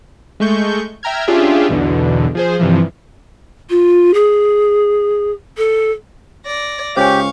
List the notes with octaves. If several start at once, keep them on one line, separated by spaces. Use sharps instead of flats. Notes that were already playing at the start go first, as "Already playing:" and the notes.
G#3 A3 C#6 G6
E5 G5 A#5 F6 G#6
C#4 D4 F4 G4 G#4 E5
B1 E2 B2 D3
F3 G#4 C5
G2 C3 E3 F3
F4
G#4
A4
D5 A#6
C#2 G4 C5 C#5 F5 G#5 C#6